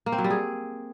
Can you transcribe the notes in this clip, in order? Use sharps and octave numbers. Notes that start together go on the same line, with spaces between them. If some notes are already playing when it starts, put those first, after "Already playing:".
A#3
C4
F#3
G3
G#4